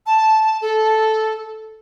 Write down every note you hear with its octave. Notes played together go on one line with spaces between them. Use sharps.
A5
A4